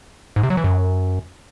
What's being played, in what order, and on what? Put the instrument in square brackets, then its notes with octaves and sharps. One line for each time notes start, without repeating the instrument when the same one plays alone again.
[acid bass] G#2
C3
F#3
E3
F#2